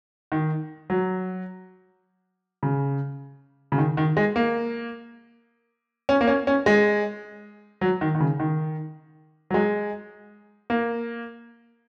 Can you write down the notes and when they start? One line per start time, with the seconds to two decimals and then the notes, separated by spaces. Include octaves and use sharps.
0.32 D#3
0.90 F#3
2.63 C#3
3.72 C#3
3.78 D#3
3.97 D#3
4.17 G#3
4.36 A#3
6.09 C#4
6.21 A#3
6.27 C#4
6.47 C#4
6.66 G#3
7.81 F#3
8.01 D#3
8.15 D#3
8.20 C#3
8.40 D#3
9.50 F#3
9.54 G#3
10.70 A#3